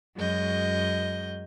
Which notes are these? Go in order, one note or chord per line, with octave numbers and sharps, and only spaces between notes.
F#2 F#3 G#3 D#5 G6